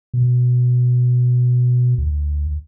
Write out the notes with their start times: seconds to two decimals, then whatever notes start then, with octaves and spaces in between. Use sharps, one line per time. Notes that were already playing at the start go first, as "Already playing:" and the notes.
0.14 B2
1.98 D2